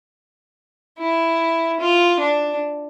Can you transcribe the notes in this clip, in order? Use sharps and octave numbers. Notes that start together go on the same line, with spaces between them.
E4
F4
D4